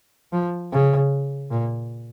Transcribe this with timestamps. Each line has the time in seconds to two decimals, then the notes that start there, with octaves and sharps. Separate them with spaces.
0.32 F3
0.72 C#3
1.50 A#2